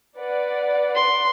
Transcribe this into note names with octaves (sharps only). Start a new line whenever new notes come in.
B4 D5 F#5
C6